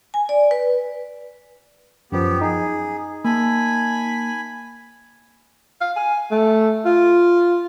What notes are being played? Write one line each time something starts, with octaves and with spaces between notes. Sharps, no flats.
G#5
D5
B4
F#2 F3 B3 G4
D#4 G#4
A#3 G#5 A5 B5
F5
G#5
A3
F4